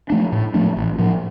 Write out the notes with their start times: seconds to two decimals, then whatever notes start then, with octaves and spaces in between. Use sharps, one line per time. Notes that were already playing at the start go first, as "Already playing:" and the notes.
0.10 F3 A3 D4
0.32 A2
0.54 F3 A3 D4
0.77 A1
0.99 A2 F3